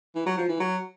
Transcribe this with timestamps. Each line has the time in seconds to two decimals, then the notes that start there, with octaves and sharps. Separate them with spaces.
0.15 E3
0.26 F#3
0.38 F3
0.49 E3
0.60 F#3